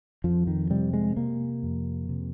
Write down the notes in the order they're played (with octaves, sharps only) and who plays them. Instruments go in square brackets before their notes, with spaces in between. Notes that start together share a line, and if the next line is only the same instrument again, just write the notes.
[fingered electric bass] F2 F3
D#3
C3 G3
G#3
C3 A#3
F2
C3